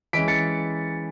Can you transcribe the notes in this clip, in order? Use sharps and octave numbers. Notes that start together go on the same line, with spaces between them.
E3 G#3 C#4 B6 D7
A6 C#7